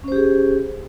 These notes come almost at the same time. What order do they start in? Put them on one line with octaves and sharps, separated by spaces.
C#4 C5 G4 G#4